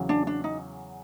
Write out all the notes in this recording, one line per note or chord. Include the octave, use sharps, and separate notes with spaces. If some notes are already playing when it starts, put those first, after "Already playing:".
Already playing: E2 C#3 F#3
D4
D4
D#4